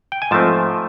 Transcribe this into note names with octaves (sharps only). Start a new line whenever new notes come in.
G5
G#5
G#2 F3 A3 C4 A5